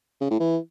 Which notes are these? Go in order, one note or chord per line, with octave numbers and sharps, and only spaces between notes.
C#3
A2
E3